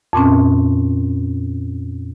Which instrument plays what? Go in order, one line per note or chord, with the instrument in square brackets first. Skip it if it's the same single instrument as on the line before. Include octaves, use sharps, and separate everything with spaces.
[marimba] F2 A#2 C4 C#4